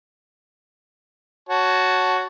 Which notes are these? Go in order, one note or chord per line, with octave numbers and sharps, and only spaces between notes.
F#4 C#5 A5